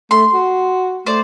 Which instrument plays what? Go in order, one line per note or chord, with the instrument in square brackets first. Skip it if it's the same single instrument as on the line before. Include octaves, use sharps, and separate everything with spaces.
[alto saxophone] A3 [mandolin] C6
[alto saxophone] F#4
[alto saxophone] A3 [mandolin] C5 D5